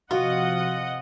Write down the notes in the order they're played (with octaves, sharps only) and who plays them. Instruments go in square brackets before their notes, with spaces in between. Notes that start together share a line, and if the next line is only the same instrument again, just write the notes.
[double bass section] C3 F3 [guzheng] F4 [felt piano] F#4 [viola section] D#5 F#5